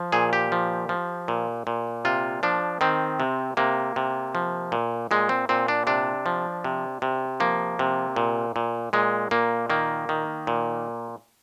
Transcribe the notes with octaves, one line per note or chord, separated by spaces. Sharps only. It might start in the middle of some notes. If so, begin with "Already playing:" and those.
Already playing: F3
A#2 G#4
G4
F3
F3
A#2
A#2
C3 F4
F3 D4
D#3 C4
C3
C3 A#3
C3
F3
A#2
A#2 G#3
C4
A#2 C4
D4
C3 D4
F3
C3
C3
F3 A#3
C3
A#2
A#2
A#2 G#3
A#2 A#3
D#3 A#3
D#3
A#2